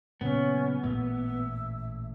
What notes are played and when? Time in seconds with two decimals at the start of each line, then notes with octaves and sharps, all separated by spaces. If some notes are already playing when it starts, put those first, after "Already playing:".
0.21 A#2 C#3 F#3 B3 C#4
0.83 A1 A#2 A#3 E5